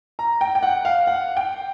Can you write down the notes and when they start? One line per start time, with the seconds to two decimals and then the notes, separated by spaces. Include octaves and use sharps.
0.19 A#5
0.41 G5
0.55 G5
0.63 F#5
0.85 F5
1.07 F#5
1.37 G5